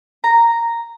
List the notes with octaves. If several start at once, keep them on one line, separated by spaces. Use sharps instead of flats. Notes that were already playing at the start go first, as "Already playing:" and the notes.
A#5